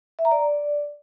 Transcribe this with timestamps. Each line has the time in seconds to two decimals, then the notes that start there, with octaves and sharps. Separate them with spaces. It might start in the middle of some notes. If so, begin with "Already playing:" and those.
0.19 E5
0.25 A#5
0.31 D5